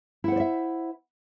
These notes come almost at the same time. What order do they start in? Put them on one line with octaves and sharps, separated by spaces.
E4 F#5 C5 D5 E5